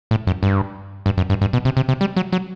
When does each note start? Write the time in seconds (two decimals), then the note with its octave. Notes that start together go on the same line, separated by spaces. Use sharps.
0.11 A2
0.27 F#2
0.43 G2
1.06 G2
1.18 F#2
1.30 G2
1.41 G2
1.53 B2
1.65 C3
1.77 C3
1.88 C3
2.01 G3
2.16 F#3
2.32 F#3